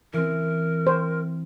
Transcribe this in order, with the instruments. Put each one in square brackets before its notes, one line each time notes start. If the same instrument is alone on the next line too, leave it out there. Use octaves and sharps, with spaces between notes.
[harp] E3 C4 [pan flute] A#4
[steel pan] C5